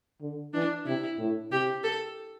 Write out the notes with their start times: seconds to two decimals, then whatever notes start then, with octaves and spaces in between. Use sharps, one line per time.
0.21 D3
0.53 E3 D4
0.86 C3 E4
1.18 A2
1.51 C3 G4
1.84 A4